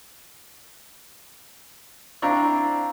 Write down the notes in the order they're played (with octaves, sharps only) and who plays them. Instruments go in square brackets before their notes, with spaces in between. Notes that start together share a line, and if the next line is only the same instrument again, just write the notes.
[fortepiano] C4 D4 E4 [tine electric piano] F5 A#5 C#6